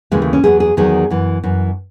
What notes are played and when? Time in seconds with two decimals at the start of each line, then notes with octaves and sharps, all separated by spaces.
0.11 D#2 C#3 E3 G#3
0.22 A3
0.33 C#4
0.44 E2 D#3 F#3 G#4
0.60 G#4
0.77 E2 D#3 F#3 G#4
1.10 F#2 E3
1.43 F#2 E3